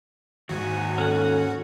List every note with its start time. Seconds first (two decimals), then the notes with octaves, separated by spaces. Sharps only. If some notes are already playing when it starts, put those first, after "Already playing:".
0.49 D#2 G#2 F#4 G#5
0.98 C#4 A4 F#5